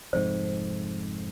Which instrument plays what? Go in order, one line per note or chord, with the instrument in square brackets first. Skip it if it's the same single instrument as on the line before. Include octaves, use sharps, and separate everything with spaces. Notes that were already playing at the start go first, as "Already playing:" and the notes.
[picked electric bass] F1 F2 G#2 [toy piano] C5